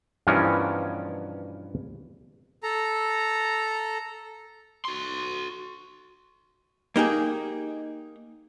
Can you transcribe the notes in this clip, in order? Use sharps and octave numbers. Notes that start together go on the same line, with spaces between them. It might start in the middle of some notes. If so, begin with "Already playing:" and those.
G2 B2 E3 F3 C#4 A#4
A4 A#5
F#4 C6
A#3 D#4 G4 G#4